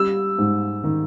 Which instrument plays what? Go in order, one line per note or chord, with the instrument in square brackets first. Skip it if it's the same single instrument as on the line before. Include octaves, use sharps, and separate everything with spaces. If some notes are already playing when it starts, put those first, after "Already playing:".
Already playing: [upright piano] G3 E6
G#2
D#3